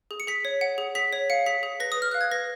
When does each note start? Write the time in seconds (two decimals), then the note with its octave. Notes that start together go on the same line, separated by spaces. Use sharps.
0.11 G#4
0.20 C#7
0.27 G#4 B6
0.45 C#5
0.61 F#5
0.78 G#4
0.95 G#4 B6
1.13 C#5
1.30 F5 C#7
1.46 G#4 B6
1.63 G#4
1.80 B4 A#6
1.92 D#6
1.97 B4 F6
2.12 F5 F#6
2.21 G#6
2.32 B4 A#6